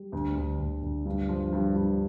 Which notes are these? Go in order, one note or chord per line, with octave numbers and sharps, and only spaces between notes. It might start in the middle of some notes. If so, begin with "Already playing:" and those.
Already playing: G3
D2
D2
D2
D2
G2
F3
G2
G2